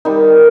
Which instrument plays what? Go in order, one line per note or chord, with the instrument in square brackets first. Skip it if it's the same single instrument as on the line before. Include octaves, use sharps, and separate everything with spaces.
[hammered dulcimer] D#3 G3 D#4